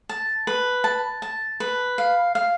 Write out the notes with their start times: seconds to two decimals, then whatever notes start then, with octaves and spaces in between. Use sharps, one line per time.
0.09 A5
0.47 B4
0.84 A5
1.22 A5
1.60 B4
1.98 F5
2.35 F5